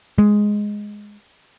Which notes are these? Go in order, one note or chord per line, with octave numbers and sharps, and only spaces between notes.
G#3